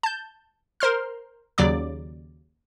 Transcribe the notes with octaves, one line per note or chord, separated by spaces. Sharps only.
A5 G6
A#4 C5 C6 F6
D#2 C#3 F#3 D5 D6